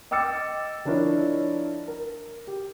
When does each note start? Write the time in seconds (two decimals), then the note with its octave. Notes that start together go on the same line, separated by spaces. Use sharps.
0.11 D#5 G5 D6 E6 A6 C#7
0.85 F3 D4 E4 A#4 C#5 D#5
1.88 A#4
2.47 G4